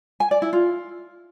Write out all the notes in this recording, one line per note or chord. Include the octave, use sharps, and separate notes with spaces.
G#5
D5
E4
F4